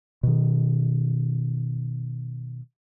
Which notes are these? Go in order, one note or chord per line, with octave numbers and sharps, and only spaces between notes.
B2 D#3